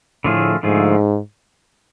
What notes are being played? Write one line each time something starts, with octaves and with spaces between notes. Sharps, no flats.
A2 D3 F3 A3 F4 G#4
G#2 D3 F3 A3 F4 G#4